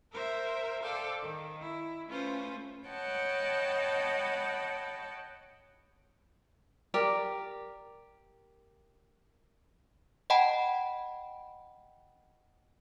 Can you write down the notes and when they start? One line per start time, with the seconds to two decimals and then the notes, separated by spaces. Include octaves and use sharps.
0.12 A#4 C5 E5
0.83 A4 C5 D5 F5 G5 A5
1.21 D#3
1.61 E4
2.08 A3 C#4 F4 B4 C5
2.86 C#5 D#5 F#5 G5 A5 B5
6.94 G4 A#4 D5
10.30 D#5 F#5 G5 A5 B5